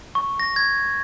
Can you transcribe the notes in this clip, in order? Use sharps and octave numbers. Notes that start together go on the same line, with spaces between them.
C#6
A#6
G#6